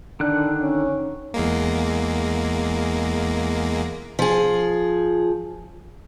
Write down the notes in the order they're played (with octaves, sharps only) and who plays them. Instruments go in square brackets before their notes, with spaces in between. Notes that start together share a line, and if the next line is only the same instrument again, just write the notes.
[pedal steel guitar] D3 D#3 F#6 [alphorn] D4
[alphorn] C#4
[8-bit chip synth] E2 G#3 A#3
[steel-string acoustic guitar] F3 G#4